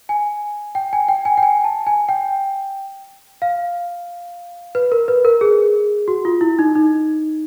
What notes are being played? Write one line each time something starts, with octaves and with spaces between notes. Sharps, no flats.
G#5
G5
G#5
G5
G#5
G5
G#5
A5
G#5
G5
F5
B4
A#4
B4
A#4
G#4
F#4
F4
E4
D#4
D#4